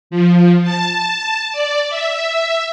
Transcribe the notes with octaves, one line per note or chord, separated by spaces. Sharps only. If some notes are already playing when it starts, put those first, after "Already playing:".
F3
A5
D5
E5